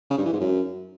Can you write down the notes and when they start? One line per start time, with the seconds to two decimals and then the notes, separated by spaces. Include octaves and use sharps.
0.11 C#3
0.18 G2
0.25 E3
0.33 G#2
0.40 F#2